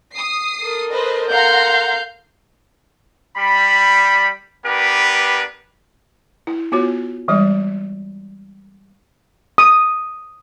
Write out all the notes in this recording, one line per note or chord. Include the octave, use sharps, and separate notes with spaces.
D#6 C7
A4 A#4
B4 C5 D#5
F5 F#5 A#5 C6 G6
G3 B5
B3 D4 G4 A#4 B4
E4
B3 F4 F#4 C#5
E3 G3 G#3 D5
D#6